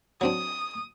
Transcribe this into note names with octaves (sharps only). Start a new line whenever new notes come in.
F#3 C4 D4 D#6